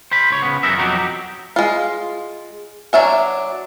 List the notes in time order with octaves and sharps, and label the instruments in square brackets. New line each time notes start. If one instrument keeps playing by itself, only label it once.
[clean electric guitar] C5 B5
C#2 C#5
C#3 B3
F#2 B3 D#4 A#4 E5
F2 B2 F#3 D#4 F#4 G4
[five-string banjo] G#3 F4
F#3 D4 E5 G#5